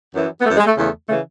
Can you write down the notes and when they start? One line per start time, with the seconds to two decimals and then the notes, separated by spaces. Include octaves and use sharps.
0.15 F#2 E3
0.41 B3
0.46 F#2 E3 A3
0.57 G#3
0.66 A3
0.77 E2 C#3 E3 A3
1.09 C#3 E3 A3